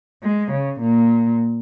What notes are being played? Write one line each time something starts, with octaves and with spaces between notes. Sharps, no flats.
G#3
C#3
A#2